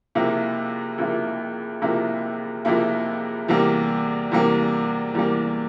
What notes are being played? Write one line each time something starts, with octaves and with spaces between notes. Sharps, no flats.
C#2 C3 F3 A#3 E4
C#2 C3 F3 A#3 E4
C#2 C3 F3 A#3 E4
C#2 C3 F3 A#3 E4
E2 C3 G3 A#3
E2 C3 G3 A#3
E2 C3 G3 A#3